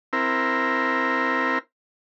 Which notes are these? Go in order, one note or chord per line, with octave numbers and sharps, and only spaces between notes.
C4 E4 A#4